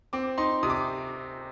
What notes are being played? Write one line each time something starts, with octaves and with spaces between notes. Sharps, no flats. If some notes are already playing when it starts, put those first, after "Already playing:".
C4 D6
D#4 C6
C3 D#6
D6